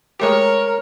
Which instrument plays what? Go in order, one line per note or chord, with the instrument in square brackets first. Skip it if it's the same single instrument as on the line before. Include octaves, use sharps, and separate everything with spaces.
[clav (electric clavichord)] G#3 A3 G4 [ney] A#4 [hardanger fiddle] C#5